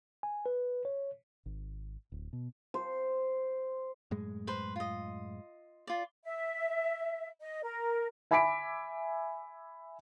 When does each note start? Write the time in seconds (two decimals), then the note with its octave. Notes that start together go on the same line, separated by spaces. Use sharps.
0.23 G#5
0.46 B4
0.85 C#5
1.46 G#1
2.12 D1
2.33 B2
2.74 C5
4.11 F#2 A2 G#3
4.47 B4 C5
4.76 F4 D#5
5.87 F4 D5
6.25 E5
7.41 D#5
7.63 A#4
8.31 E5 G#5 B5 D6 B6 D7